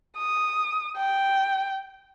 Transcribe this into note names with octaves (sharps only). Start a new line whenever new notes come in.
D#6
G5